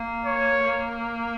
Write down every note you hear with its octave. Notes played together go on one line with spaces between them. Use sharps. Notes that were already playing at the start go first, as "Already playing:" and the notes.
Already playing: A#3
C#5
A#3